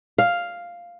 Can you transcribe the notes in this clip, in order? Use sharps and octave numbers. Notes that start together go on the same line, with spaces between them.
F5